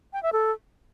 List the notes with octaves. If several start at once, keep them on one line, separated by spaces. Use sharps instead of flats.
G5
E5
A4